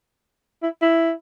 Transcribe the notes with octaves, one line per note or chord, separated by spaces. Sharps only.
E4
E4